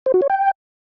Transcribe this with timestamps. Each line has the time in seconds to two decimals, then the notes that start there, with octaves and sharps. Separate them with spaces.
0.06 C5
0.14 F#4
0.22 C#5
0.30 G5